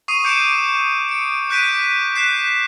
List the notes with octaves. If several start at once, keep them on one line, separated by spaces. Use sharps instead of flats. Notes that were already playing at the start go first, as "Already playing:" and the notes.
C#6 D#6 C7 D#7
D6 G6 C#7 D7 E7
C#7 D7
D6 F#6 G6 B6 D7 D#7
F#6 G6 B6 C7 E7